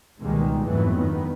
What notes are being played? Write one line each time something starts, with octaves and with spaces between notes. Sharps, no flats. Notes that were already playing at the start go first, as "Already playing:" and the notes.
C#2 B2 D#3 G3 G#3 A#3
F2 G#2 E3 F#3 A3 B3
G2 D#3 B3